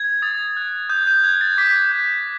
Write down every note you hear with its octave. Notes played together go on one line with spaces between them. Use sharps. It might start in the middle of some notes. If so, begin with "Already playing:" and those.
Already playing: G#6
D#6 A6
F#6
D#6 G6
G6
F#6 G#6
A6
D6 B6
G6